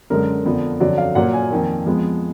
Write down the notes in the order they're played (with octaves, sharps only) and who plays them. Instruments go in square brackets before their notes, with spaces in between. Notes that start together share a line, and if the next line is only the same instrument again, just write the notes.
[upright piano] F#2 D3 G#3 A#4
F2 D3 F3 B3
F2 D3 F#3 D5
F5
A#2 F#3 A#3 F#5
G#5
F2 D#3 A#3
F2 F3 G#3 B3